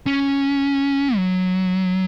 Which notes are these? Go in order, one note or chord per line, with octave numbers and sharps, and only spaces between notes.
C#4
F#3